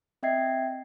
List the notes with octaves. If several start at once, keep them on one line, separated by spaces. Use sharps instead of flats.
C4 D#5 E5 G5 G#6 C7